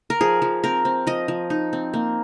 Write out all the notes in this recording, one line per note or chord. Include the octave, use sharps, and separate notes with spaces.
A#4
F3 G#4
F3
C4 A#4
C4
F3 D#5
F3
D#4
C4
A#3